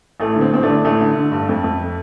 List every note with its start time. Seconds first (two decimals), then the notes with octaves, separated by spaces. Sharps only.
0.20 A1 A3
0.36 D3
0.41 C4
0.53 A1 C4
0.63 D3 A3 D4
0.85 A1 A3
1.01 D3
1.16 D3
1.32 G2
1.49 F2
1.64 F2